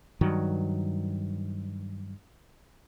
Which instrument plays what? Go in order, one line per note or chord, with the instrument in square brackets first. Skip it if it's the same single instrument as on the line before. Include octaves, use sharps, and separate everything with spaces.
[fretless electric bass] G2 D#3 F#3